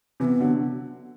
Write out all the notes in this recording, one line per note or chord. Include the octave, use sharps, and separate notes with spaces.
C3 E3 B3 C4
D3 F#3